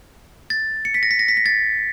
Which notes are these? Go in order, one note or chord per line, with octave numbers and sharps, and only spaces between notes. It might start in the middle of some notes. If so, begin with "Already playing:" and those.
A6
C#7
B6
A#6
B6
A#6
B6
A#6
A6